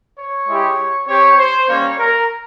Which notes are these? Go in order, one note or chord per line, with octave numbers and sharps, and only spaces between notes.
C#5
G#3 E4 G4
C4 G4 C#5
C5
G3 A#3 C#4 C#5
A#4